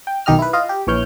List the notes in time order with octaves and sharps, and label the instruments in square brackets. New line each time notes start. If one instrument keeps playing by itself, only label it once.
[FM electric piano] G5
B1 D#3 G4 D#5 F6
E4 B4
F4 D#5 F5
G4
A#1 E3 C#5 F6 G6